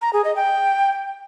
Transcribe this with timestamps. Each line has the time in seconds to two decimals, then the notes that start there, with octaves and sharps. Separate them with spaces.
0.02 A#5
0.13 G#4
0.25 D#5
0.36 G5